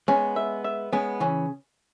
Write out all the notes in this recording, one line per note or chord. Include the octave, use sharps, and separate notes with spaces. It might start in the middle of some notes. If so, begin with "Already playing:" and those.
G#3 B3 C#4
E5
E5
G#3 B3 C#4
C#3 E3 C#4